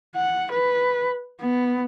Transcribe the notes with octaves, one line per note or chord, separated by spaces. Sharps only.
F#5
B4
B3